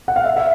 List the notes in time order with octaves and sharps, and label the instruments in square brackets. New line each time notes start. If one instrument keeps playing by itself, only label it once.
[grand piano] F#5
F5
E5
E5